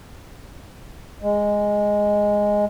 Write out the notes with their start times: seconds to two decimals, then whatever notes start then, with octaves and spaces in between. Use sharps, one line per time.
1.22 G#3